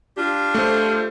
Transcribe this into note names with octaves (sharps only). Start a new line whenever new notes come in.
D4 F4 G4
A3 C5